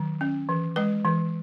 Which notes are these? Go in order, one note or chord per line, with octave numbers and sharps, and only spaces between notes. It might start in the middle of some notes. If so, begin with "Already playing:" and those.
Already playing: D#3 F#3
C#4
E3
G#3 B4
E3